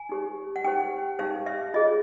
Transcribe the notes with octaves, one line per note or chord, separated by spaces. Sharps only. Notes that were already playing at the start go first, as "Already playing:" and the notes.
Already playing: G#5
D#4 G4 C5
F#5
D#4 G4 C5 G5
D#4 G4 C5 F5
E5
F4 G#4 C#5 D#5